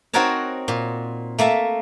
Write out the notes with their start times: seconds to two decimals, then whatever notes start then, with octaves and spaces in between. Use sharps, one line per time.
0.14 C4 D#4 F#4 A#4 C#5 A5
0.68 A#2
1.39 A3 A#3 E5 A5